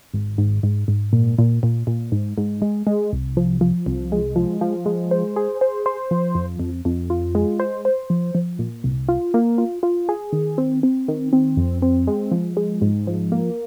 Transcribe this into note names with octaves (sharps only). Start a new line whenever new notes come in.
G#1
G#2
G#2
G#2
A#2
A#2
A#2
A#2
G#2
G#2
G#3
G#3
C2
F3
F3
C2
G#3
F3
F3
G#3
C5
G#4
C5
C5
F3
F2
F2
F2
F4
G#3
C5
C5
F3
F3
A#2
C2
F4
A#3
F4
F4
G#4
D#3
C4
C4
D#3
C4
F2
C4
G#3
F3
G#3
G#2
F3
A#3